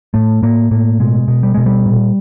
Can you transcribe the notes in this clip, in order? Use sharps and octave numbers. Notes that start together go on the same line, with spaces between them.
A2 A3
A2 A#3
A2 A#3
B2 G#3
B2
G3
B2 G#3
G3
A#2